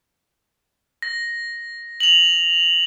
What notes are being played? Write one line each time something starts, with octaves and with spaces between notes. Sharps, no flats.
A#6
F7 F#7